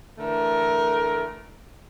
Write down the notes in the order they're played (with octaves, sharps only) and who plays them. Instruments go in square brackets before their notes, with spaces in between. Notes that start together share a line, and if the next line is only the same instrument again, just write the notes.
[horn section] D3 E3 A3 A#4